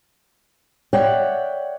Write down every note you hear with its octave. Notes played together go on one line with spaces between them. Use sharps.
C#5 D5 E5 F#5 G5